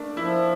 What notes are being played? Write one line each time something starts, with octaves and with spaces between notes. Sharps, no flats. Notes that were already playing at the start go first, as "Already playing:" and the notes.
Already playing: A3 A#3 D4
F3 E4